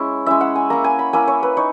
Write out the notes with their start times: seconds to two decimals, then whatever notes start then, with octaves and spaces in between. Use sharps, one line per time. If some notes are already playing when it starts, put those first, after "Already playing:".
Already playing: G#3 C#4 E4
0.26 G#3 C#4 E4 E5
0.41 F#5
0.56 G#5
0.70 A#3 E4 A#5
0.84 G#5
0.99 B5
1.13 A#3 E4 G#5
1.28 C#5
1.43 B4
1.57 D#4 C#5